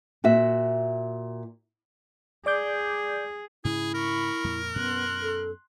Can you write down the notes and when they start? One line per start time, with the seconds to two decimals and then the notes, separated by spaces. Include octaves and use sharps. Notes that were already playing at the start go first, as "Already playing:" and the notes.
0.24 A#2 F#4 E5
2.46 G#4 D5 D6 G6
3.65 G#2 C#3 E4 G#4
3.94 A#4 B5 C#6
4.44 F2 A#2
4.76 F#2 B2 B3 C#4 C6 F#6
5.22 A4